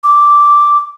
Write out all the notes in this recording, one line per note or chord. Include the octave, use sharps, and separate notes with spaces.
D6